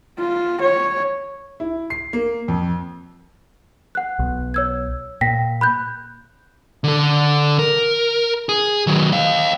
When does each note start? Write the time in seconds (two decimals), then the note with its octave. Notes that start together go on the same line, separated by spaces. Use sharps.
0.18 F4
0.61 C#5
1.60 E4
1.90 C7
2.13 A#3
2.48 F2
3.95 F#5 F#6
4.19 B1
4.54 C#5 E6 G#6
5.21 A#2 G5 A#6 B6
5.61 B5 F#6 G6
6.84 D3 A4
7.59 A#4
8.49 G#4
8.87 D#3 F#3
9.12 D#5 F5